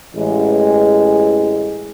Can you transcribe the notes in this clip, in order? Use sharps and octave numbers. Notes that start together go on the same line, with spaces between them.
A1 G#3